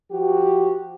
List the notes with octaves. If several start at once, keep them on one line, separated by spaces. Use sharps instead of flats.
F3 F#4 G4